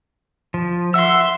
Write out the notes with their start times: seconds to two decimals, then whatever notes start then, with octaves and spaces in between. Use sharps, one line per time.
0.54 F3
0.94 E5 F#5 C6 E6